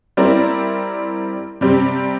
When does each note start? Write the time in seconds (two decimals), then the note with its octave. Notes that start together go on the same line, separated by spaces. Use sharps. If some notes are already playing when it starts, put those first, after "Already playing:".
0.17 G3 C4 E4 A#4 D5
1.61 C3 G3 C4 G4